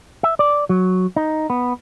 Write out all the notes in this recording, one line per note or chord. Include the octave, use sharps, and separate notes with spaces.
E5
D5
F#3
D#4
B3